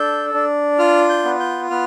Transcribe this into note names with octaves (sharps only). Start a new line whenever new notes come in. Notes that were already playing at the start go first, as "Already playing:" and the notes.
Already playing: D4 A4 G6
D4
F4 F6
G6
B3
G6
B3 F6